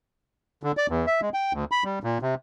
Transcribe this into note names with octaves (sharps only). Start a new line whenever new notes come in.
D3
D5
E2
E5
G#3
G5
D2
B5
G3
A#2
C3